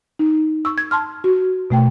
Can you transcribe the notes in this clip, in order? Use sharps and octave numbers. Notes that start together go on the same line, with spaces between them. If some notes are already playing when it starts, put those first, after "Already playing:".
D#4
C#6 E6
G#6
A5 C6 F6
F#4
B2 A3 G5